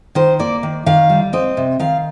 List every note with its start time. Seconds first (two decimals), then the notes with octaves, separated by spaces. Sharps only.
0.15 D#3 C5
0.39 A#3 D5
0.63 D#3
0.86 D#3 F5
1.10 G3
1.33 C4 D#5
1.57 C3
1.79 D#3 F5